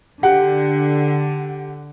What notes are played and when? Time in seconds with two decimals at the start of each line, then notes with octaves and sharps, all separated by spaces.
0.23 D3 G4 F#5